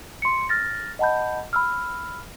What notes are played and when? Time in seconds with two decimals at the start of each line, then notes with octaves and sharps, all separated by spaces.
0.22 C6 C#7
0.49 F6 A6 A#6
0.99 D#5 F#5 A5 B5 G6
1.53 B5 E6 F6